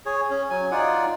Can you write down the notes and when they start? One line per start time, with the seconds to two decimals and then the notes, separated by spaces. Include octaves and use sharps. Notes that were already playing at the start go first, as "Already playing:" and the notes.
0.06 G#4 C#5
0.30 C#4
0.50 F#3 G#5
0.71 D#4 F4 D5 F#5